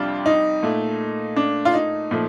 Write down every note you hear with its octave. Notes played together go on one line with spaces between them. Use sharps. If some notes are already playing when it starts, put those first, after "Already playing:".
Already playing: F2 C3 G3 D4 F4
D#4
A#2 A3
D4
F4
D#4
A#2 F3 A3